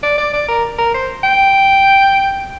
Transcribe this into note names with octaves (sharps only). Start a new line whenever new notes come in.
D5
D5
D5
A#4
A#4
C5
G5